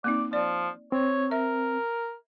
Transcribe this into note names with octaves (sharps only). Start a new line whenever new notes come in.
A#3 C4 D#4 D5
F3 D5
C4 C#5
A#4 E5